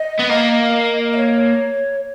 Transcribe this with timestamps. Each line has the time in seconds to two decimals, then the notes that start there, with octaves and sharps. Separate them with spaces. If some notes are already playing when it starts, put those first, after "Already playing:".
Already playing: D#5
0.19 B3
0.29 A#3
1.13 D#5
1.17 C#5